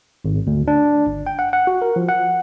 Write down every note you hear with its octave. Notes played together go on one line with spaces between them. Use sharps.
G#1
D2
D4
G1
G5
F#5
F#5
F#4
A#4
F3
F#5